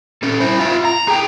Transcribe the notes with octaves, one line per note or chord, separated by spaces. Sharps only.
C#4 A4
E4 C5
F4 E5
A#5
G#4 G5